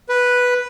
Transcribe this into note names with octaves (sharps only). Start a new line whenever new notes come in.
B4